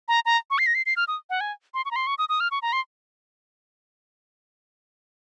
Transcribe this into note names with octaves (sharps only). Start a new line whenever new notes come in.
A#5
A#5
C#6
C7
A#6
C7
C7
F6
D#6
F#5
G#5
C6
C#6
A#5
C6
C#6
D#6
D#6
F6
C#6
A#5
C6